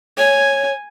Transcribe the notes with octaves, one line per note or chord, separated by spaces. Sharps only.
C#5 G#5